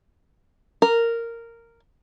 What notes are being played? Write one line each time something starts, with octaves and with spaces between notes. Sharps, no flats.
A#4